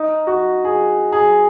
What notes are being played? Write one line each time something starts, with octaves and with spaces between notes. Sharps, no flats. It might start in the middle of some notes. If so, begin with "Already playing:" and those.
Already playing: D#4
F#4
G#4
G#4